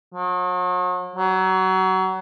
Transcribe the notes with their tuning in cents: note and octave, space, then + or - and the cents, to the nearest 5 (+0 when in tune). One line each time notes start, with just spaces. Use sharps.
F#3 -40
F#3 +25